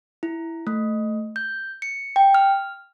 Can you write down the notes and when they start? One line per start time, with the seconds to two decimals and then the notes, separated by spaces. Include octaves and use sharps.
0.23 E4
0.67 A3
1.36 G6
1.82 C#7
2.16 G5
2.34 F6